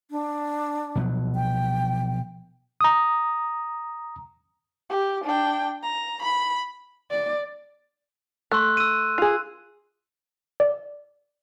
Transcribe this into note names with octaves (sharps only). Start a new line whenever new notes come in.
D4
B2 F3 F#3
G5
A#5 D#6
G4
D4 G5
A#5
B5
D5
A3 C6 E6 F#6
E6 D#7
F4 G#4
D5